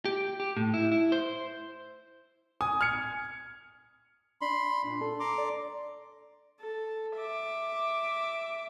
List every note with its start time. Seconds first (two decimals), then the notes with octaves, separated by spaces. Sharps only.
0.05 G4
0.40 G4
0.57 A2
0.74 E4
0.92 E4
1.12 C5
2.61 G#5 D#6
2.81 F6 G#6 C#7
4.41 D4 B5 C6
4.84 A#2 D4
5.01 A4
5.20 A#5 C6 D6
5.38 D5
6.61 A4
7.17 E5 D6